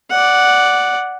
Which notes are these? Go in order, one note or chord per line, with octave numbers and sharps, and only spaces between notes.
D5 F#5